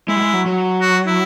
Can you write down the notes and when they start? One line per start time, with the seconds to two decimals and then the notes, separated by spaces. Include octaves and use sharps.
0.08 G#3 E4
0.16 G3
0.21 G#3
0.33 F#3
0.46 F#3
0.81 F#4
1.06 E4